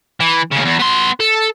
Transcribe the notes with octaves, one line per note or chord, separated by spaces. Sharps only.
E3
D#2 C#3
E2
B3 C6
A4